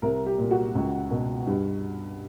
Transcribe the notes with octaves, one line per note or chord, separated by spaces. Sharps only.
C2 A#4
G4
A#2
F#4
C#2
B2
G2